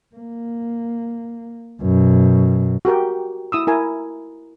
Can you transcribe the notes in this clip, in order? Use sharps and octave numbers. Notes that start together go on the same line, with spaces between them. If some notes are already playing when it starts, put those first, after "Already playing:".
A#3
F#2 B2
F#4 G4 A#4 G5
E4 D#6 E6
E4 A#4 G#5